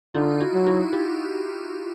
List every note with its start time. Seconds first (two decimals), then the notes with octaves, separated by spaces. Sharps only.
0.14 D3 D#4 F4
0.40 E4 F#4
0.54 F#3
0.67 E4 F#4
0.93 F4 G4